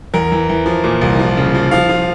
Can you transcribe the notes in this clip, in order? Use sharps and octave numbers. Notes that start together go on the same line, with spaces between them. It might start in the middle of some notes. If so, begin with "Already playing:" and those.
E2 A#4
E3
E3
F3
A#2
C2
F3
C#3
F3
F3 F5
F3